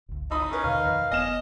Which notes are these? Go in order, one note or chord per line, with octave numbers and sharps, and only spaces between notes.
G1 C#2
D#4 B5 D#6 E6
C#4 A#4 B4
D#2 B2 D#3 F5
F2
F#1 B3 D#5 G#5 E7